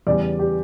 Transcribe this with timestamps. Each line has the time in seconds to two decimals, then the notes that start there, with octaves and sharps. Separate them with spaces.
0.07 E2 C#3 G3 D5
0.39 G4